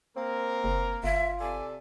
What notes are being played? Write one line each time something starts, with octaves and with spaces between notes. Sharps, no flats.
A#3 C4 A#4
F#1
G1 F4 E5
C3 A4 D5 G#5